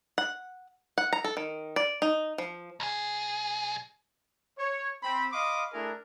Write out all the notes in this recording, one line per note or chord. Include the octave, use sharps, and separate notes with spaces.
F#5
F#5
A#5
A4
D#3
D5
D#4
F3
B1 G#4
C#5
C4 B5
D#5 F5 B5 C6 D6 D#6
A3 D4 E4 G#4 A#4